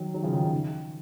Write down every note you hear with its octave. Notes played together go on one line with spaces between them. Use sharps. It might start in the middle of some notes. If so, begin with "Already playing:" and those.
Already playing: D#3 F#3
D#3 F#3
C#3 F3
D#3
C#3
D#3